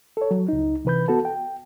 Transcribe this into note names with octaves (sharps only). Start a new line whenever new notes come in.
A4 C#5
F#3
C#2 D#4
C3 E3 B4 B5 G6
B3 F#4 A4 A5
G5